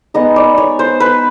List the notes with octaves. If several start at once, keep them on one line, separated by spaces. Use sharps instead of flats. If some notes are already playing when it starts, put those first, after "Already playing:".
G#3 B3 D#4 D#5
D5
C#5
C5
B4